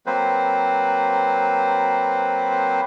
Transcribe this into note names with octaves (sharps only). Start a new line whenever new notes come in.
F#3 A#3 C4 B4 C5